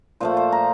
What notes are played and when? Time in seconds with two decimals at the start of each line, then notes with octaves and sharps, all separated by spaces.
0.20 A#2 F3 A3 C5
0.37 C5
0.52 A#5